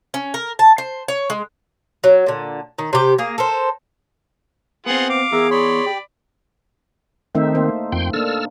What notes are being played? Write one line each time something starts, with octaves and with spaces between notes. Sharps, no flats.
C#4
A#4
A5
C5
C#5
G#3
F#3
A#2 D3
D#3
C3 G4
A#3 G#4
A4 A#4 C5
B3 C4 F4 G#4 F#5
F5 D6
E2 G#4 A#4 E5 A#5
C#5 D5 B5 C6
G4
D#3 A3 C4 D#4 E5
A#3 C5
F2 G5 C6
A#3 D4 A4 E6 F6